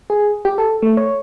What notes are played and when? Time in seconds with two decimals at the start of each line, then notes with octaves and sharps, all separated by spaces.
0.10 G#4
0.45 G4
0.58 A4
0.82 A3
0.97 C#5